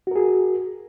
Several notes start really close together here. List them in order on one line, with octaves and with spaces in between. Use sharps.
F#4 A#4 G#4